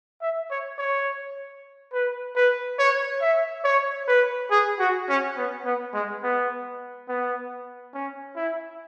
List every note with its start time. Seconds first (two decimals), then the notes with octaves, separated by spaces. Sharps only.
0.22 E5
0.51 C#5
0.78 C#5
1.93 B4
2.36 B4
2.79 C#5
3.22 E5
3.64 C#5
4.08 B4
4.51 G#4
4.80 F#4
5.09 C#4
5.37 B3
5.65 B3
5.94 G#3
6.23 B3
7.08 B3
7.94 C#4
8.37 E4